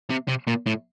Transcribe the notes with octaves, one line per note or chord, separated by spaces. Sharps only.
C3
C3
A#2
A2